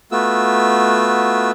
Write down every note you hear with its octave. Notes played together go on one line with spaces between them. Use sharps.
A3 B3 F4 F#4 E6